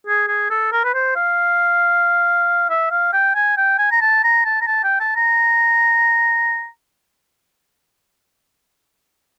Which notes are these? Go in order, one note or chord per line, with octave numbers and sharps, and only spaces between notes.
G#4
G#4
A4
A#4
B4
C5
F5
E5
F5
G5
G#5
G5
G#5
A#5
A5
A#5
A5
A#5
A5
G5
A5
A#5